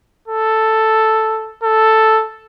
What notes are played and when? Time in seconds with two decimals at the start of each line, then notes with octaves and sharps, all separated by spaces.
0.28 A4
1.64 A4